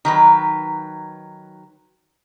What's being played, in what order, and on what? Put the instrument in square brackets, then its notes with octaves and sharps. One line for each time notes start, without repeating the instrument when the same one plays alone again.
[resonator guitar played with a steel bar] D#3 F#3 B4